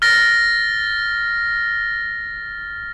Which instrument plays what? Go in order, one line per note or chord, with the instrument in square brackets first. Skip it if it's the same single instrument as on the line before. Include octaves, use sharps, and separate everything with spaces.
[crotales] F6 A6 A#6